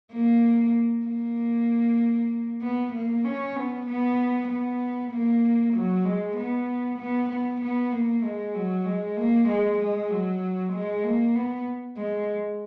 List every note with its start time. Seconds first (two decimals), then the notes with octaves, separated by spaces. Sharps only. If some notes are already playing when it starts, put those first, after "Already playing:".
0.12 A#3
1.05 A#3
2.62 B3
2.93 A#3
3.24 C#4
3.56 B3
3.87 B3
4.48 B3
5.11 A#3
5.74 F#3
6.05 G#3
6.36 B3
6.98 B3
7.30 B3
7.61 B3
7.92 A#3
8.23 G#3
8.54 F#3
8.86 G#3
9.17 A#3
9.48 G#3
9.79 G#3
10.10 F#3
10.73 G#3
11.04 A#3
11.35 B3
11.97 G#3